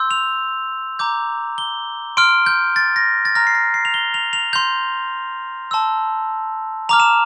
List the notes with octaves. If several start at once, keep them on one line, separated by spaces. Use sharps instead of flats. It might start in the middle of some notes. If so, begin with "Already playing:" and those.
Already playing: C6 E6 G6
F7
A#5 D6 G6
G7
C6 F6 D7
G6
A6
A#6
A6
A#5 F6 A#6
C7
A#6
C7
F7
G7
F7
F7
C6 G6 F7
A5 C6 E6
A#5 D6 F6 F7
E7